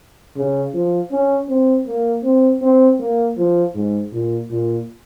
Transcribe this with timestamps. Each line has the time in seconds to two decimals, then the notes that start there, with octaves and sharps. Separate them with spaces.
0.36 C#3
0.74 F3
1.11 C#4
1.48 C4
1.87 A#3
2.23 C4
2.62 C4
2.99 A#3
3.37 F3
3.75 G#2
4.12 A#2
4.50 A#2